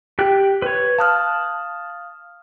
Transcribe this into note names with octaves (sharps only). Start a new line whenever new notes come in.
G4 G5 F#6
B4 C#5
F5 A5 D#6 F6 F#6